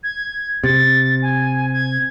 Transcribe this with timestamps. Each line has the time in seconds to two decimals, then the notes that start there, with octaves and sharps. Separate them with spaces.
0.03 G#6
0.64 C3 A6
1.22 G#5
1.73 G#6